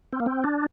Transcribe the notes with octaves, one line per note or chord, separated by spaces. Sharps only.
C4
A#3
C4
D4